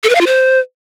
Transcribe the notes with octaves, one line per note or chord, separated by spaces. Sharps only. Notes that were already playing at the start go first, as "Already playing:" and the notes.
A4
B4
F5
F4
C5